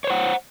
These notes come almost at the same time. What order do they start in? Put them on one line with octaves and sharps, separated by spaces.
C#5 C5 F#5